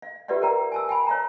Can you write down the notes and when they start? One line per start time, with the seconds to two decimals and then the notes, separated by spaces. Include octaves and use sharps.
0.02 F5
0.28 F4 G4 B4 D5 E5 F#5
0.42 A#4 F#5 G5 A#5
0.72 G#5 A5 E6
0.89 G5 G#5 B5
1.07 C#5 F5 A#5